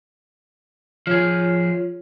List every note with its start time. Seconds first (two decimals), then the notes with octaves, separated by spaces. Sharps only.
1.07 F3 F4 G#4 C#5